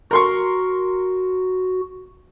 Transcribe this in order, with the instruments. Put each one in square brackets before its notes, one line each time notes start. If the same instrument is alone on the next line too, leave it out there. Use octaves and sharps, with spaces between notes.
[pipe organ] F#4 [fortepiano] A#4 C6 C#6